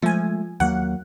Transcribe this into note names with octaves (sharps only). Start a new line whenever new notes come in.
F3 G#3 A3 G#5
D#2 F#3 A#3 F#5